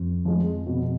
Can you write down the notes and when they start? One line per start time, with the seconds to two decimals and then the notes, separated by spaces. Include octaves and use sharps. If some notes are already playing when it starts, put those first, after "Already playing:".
Already playing: F2
0.25 F3 G#3
0.67 B2